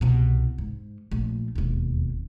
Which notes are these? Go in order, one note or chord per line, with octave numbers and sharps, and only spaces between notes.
C2 B2
G#2
A#1 A3
E1 D#2